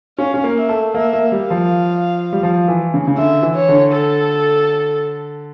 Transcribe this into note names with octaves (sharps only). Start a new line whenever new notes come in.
C#4 F5
C#4
A#3
E5
A3
A#3 E5
A#3
G3 F5
F3
G3
F3
E3
C#3
C#3
D3 E5
E3
C#5
D3
A4